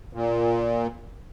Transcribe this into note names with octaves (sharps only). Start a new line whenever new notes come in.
A#2